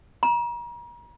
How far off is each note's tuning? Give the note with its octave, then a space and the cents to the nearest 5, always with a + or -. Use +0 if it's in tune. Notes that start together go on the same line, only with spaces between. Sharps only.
A#5 +40